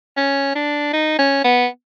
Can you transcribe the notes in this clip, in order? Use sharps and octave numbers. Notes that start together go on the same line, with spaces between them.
C#4
D4
D#4
C#4
B3